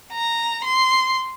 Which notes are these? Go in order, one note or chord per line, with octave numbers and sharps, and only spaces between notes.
A#5
C6